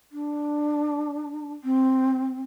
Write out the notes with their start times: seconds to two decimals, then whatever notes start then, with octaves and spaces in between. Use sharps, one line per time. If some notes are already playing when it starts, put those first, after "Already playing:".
0.12 D4
1.64 C4